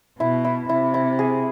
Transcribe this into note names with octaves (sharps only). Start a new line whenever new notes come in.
B2 E4
E4
C3 E4
E4
G#4